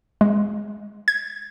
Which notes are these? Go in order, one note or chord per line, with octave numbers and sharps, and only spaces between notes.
G#3
G#6